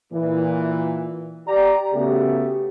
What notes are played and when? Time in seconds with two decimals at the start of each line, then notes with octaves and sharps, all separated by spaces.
0.13 A#2 E3
1.47 G4 D5 A#5
1.94 C#3 A3 B3 F#4 G4